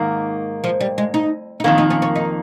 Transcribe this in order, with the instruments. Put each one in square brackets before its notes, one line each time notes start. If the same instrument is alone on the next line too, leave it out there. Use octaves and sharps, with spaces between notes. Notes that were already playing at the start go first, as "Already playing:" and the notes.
Already playing: [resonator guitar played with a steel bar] G#2 D#3 A#3
[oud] F3
G3
G#3
D#4
D#4
[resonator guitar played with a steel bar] F2 D#3 A#3 [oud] C#4
[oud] D#4
C#4
C#4
D#4